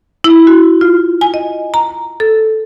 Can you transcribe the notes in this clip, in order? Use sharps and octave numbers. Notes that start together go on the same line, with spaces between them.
E4
F#4
F4
G#5
D#5
A#5
A4